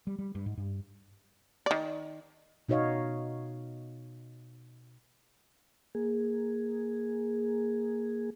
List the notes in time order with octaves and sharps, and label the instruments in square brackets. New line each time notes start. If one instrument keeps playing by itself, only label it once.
[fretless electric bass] G3
G3
G2
G#2
G2
[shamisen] D#3 D5
[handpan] B2 D#4 F#4 C#5 D#5 F5
[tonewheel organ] A#3 G#4